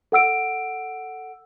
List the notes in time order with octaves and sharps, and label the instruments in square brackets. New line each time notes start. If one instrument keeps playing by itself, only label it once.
[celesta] A4 F#5 E6 D7